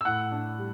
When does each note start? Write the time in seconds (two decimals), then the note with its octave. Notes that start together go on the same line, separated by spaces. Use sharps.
0.01 E6
0.05 A2 F#5 F#6
0.32 D4
0.58 G3